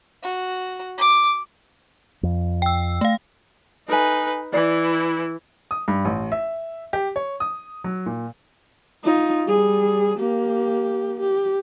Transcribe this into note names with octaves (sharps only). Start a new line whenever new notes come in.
F#4
D6
F2
G5 E6
A3 F5
D#4 A4 B4 G#5
E3 E4 D5
D#6
G2
A1
E5
G4
C#5
D#6
F#3
A#2
D#4 F4
G3 G#4
A#3 G4
G4